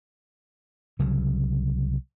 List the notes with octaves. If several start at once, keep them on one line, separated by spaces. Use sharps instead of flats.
C2 C#3 F#3